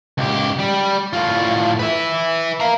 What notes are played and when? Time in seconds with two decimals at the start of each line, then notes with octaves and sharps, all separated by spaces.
0.18 C#2 G4
0.59 G3 G4
1.13 A2 F4
1.79 B4 E5
2.60 F5 A#5